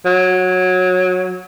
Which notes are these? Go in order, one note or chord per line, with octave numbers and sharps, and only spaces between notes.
F#3